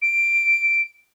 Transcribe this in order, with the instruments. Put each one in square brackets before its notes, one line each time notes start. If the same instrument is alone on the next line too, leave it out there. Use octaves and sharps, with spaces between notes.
[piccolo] D7